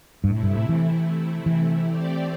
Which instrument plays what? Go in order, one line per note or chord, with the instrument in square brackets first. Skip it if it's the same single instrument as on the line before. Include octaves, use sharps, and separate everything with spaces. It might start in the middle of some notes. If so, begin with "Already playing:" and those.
[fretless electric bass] G2
[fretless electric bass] A2 [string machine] C3 A3 E4
[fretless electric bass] G2
A2
E3
E3
[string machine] A3 C4 G4 D5